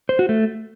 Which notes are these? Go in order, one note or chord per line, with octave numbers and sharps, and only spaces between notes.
C5
F#4
A3